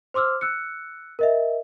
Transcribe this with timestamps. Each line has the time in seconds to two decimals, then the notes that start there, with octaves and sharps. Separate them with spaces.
0.14 C5 C6 D6 E6 F6
0.41 E6 F#6 C#7
1.19 A#4 D#5 E5